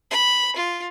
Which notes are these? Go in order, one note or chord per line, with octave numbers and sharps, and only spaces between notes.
B5
F4